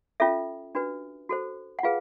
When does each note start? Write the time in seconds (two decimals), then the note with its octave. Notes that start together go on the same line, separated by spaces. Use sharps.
0.20 C#4 F4 A4 E5
0.75 D4 F#4 B4
1.29 F#4 A4 C5
1.79 F#5
1.83 F4 G#4 B4 F5